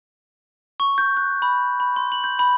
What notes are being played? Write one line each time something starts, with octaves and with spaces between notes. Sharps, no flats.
C#6
G6
F#6
B5
B5
C6
F#7
G6
B5